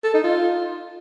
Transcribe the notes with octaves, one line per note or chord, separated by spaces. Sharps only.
A4
D#4
F4